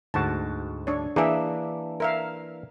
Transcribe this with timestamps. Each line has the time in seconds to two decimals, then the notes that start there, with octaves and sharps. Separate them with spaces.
0.14 D2 G#2 F#4 A5
0.87 D4 C#5
1.16 E3 A#3 D4 G#4 E5
2.00 A#4 E5 F5